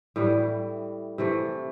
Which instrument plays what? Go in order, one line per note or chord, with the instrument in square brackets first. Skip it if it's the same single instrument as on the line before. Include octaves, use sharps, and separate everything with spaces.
[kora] A2 E3 G3
C3 E3 A3